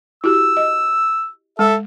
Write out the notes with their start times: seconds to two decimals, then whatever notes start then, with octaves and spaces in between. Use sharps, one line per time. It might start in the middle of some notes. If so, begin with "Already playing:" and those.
0.24 E4 F#4 G4 E6
0.57 D#5
1.59 G#3 A4 E5